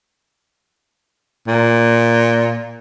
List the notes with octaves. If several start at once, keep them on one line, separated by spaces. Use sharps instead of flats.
A#2